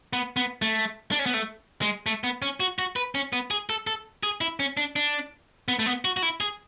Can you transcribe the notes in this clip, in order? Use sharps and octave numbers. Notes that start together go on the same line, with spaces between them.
B3
B3
A3
D4
C#4
B3
A3
G#3
A3
B3
C#4
F#4
F#4
B4
C#4
B3
G#4
A4
A4
G#4
E4
C#4
D4
D4
B3
A3
B3
F#4
F#4
E4
G#4